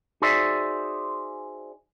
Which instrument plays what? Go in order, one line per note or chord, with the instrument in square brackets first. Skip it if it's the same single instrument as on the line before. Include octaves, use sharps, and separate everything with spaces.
[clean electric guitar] D#4 F#4 G#4 C5 D5 E5